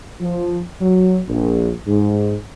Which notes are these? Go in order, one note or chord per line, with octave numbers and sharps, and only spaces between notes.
F3
F#3
A#1
G#2